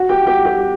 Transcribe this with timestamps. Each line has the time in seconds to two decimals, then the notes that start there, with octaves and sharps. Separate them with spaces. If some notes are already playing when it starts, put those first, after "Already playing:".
Already playing: F#4 F#5
0.09 G4 G5
0.27 G4 G5
0.45 G4 G5